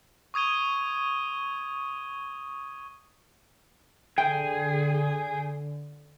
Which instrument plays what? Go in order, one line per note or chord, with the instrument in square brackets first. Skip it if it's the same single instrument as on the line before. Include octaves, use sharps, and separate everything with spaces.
[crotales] C#6 D#6 G#6 D#7 G7
[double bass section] D3 [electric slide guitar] G#4 [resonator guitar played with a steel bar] G5